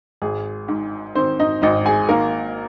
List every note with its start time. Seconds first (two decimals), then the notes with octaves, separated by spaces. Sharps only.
0.22 G#1 G#4
0.68 G#2
1.15 D#3 C4 C5
1.40 D#4 D#5
1.62 G#1 D#4 D#5
1.86 G#4 G#5
2.09 D#3 A#3 A#4